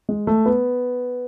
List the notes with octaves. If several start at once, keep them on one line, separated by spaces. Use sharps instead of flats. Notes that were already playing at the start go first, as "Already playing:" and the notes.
G#3
A3
B3